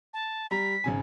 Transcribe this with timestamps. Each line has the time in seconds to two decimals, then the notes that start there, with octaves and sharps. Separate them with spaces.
0.13 A5
0.51 G3 A#5 B6
0.84 G#1 C#3 G#5